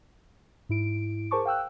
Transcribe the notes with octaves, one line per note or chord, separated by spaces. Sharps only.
G#2 E4 D7
G#4 A#4 C5 A5 C#6 D6
F5 G5 E6 F#6